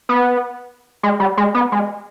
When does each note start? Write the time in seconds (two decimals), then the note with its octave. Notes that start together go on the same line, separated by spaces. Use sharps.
0.09 B3
1.03 G#3
1.20 G3
1.37 G#3
1.55 B3
1.72 G#3